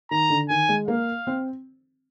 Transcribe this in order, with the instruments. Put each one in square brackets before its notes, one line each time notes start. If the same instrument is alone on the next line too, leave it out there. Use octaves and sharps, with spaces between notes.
[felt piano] D#3 [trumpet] A#5
[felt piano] D3
[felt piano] D#3 [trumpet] G#5
[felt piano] G#3
[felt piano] A#3 [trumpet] F5
[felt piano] C4